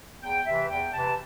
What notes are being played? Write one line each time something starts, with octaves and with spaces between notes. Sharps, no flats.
E2 G5
C3 E3 E5
E2 G5
C3 E3 A5